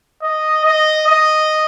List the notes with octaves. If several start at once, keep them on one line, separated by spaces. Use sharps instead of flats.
D#5
D#5
D#5